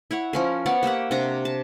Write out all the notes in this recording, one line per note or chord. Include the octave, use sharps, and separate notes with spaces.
E4 C#5 F#5
F3 C#4 A#4
B3 C#5 D5 F#5
A#3 G4 E5 F#5
C3 D4 A#5
A5